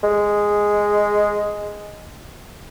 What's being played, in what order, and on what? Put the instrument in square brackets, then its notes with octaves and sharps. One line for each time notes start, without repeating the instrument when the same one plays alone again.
[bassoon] G#3